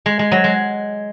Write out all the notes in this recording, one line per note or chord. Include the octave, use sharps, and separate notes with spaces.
G#3
G#3
F#3
G#3